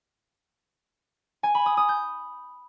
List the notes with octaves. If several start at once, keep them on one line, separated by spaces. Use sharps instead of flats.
G#5
B5
D#6
D#6
G6